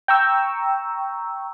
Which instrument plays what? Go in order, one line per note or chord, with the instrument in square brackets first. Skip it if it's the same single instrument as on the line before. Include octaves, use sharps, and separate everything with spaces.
[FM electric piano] G5 A#5 C#6 E6